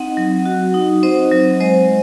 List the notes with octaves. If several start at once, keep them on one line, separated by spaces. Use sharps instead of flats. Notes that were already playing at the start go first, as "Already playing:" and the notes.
Already playing: C4 D#4 D#5 F#5
F#3
F#4
D#4
C4 C5 D#5
F#3
G#3 C5 D#5